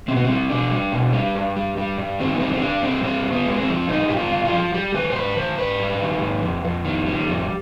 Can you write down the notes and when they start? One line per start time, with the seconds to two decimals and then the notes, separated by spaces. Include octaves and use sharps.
0.08 B2 C4
0.16 B3
0.24 G3 C4
0.49 B2 D4
0.71 G3
0.92 B2
1.13 G3
1.35 G2
1.57 G3
1.77 G3
1.98 G2
2.20 D#3 C4
2.35 B3
2.40 G3 C4
2.54 C4
2.61 G2 D4
2.83 G3 C4
3.03 G2 C4
3.26 G2
3.32 B3
3.46 G#3
3.60 C4
3.68 F3
3.89 G2 D#4
4.09 G2 G4
4.17 F4
4.31 G2
4.45 F4
4.53 F3
4.74 G3 G4
4.94 D#3 B4
5.10 C5
5.16 G#2 B4
5.36 D#3 C5
5.58 G#2 B4
5.79 G3
6.01 D#3
6.21 G#2
6.42 F2
6.64 F2
6.85 D#3
7.06 G3
7.28 F2